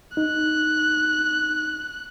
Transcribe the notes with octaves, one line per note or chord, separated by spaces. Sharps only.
D#4 F#6